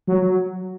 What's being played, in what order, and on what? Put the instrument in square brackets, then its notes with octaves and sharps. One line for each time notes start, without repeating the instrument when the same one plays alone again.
[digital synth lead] F#3